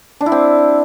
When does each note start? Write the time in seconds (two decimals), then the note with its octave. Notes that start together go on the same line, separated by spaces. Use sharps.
0.21 D4
0.26 E4
0.32 C4